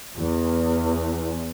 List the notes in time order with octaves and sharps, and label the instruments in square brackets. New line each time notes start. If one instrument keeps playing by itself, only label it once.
[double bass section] E2